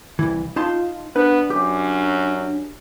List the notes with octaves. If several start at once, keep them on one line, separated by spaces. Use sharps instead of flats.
C2 F#2 E3
D#4 F4 A5 C6
B3 D4 B4
F#2 G4